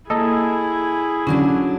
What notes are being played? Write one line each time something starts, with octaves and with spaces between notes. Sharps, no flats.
A#3 E4 G#4 A4 D#5
D3 F#3 C#4 D4